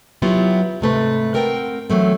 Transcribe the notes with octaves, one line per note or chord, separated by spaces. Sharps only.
F#3 B3 E4 F4 G4
G#2 C3 A3 B4
C4 A#4 F#5 G5
E3 F#3 A3 C4